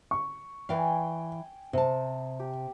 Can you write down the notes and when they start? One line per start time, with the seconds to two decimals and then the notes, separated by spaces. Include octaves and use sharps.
0.11 C#6
0.69 E3 D5 F5 G5 G#5
1.73 C3 C5 A5 D#6
2.40 G4